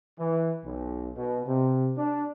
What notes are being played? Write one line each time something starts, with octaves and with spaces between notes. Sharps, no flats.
E3
B1
B2
C3
D4